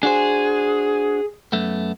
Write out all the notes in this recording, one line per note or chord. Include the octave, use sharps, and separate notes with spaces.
D4 F#4 G#4 C5
F#2 A3 B3